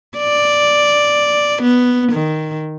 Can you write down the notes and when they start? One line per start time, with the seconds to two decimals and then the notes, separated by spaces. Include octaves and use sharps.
0.18 D5
1.63 B3
2.12 D#3